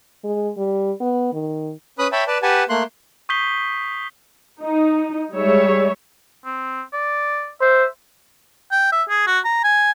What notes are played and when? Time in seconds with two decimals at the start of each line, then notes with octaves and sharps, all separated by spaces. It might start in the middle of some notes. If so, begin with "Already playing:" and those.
0.24 G#3
0.57 G3
1.00 B3
1.33 D#3
1.99 C#4 B4 B5 D#6 F#6
2.12 C#5 E5 G5 A5 B5
2.27 B4 D5 A5
2.43 G4 B4 F#5 G#5 A5
2.69 A3 A#3 C6 F#6
3.29 C#6 D#6 G6 B6 C7 G7
4.61 D#4
5.35 G3 G#3 C#5 E5
6.45 C4
6.93 D5
7.61 C5 E5
8.72 G5
8.92 E5
9.09 G#4
9.27 F#4
9.45 A#5
9.64 G#5